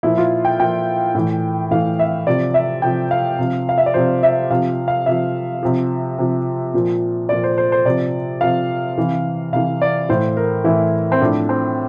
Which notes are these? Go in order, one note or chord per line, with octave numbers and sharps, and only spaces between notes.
A#2 F3 E4
F4
G5
A#2 F3 G5
A2 E3
A2 E3 F5
E5
C3 F3 D5
E5
C3 F3 G5
F5
C3 F3
F5
E5
D5
C3 F3 C5
E5
C3 F3 F5
F5
C3 F3 E5
C3 F3
C3 F3
A#2 F3
A#2 F3 D5
C5
C5
C5
C3 F3 D5
C3 F3 F5
C3 E3
C3 E3 F5
D5
A2 E3 C5
A#4
A2 E3 E4
C4
A2 F3 D4
C4